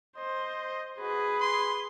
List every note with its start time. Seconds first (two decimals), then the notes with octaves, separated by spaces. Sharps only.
0.17 C5 D#5
1.00 F#4 G#4 B4
1.41 C6